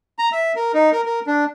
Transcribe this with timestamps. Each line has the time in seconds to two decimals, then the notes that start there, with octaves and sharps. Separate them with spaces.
0.19 A#5
0.32 E5
0.56 A#4
0.74 D#4
0.92 A#4
1.05 A#4
1.27 D4